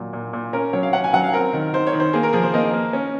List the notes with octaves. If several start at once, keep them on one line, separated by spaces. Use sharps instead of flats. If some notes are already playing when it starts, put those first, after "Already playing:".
Already playing: A#2 D#3 F#3
A#2
A#2
C#4 A#4
F#3 C#5
F5
C#4 F#5
G#5
F#3 F#5
F5
C4 A#4
D#3
D#3 C5
C#5
D#3
C5
A#3 G#4
A#4
F3 G#4
C5
A#3 D#5
A#3
C#4